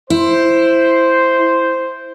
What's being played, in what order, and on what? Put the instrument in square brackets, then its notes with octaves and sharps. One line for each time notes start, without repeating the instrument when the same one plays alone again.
[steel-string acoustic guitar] E4 [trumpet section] C5